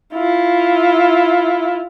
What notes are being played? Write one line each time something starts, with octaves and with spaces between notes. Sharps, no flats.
E4 F4